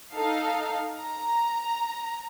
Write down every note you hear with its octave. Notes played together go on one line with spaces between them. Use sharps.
D#4 A4 F5
A#5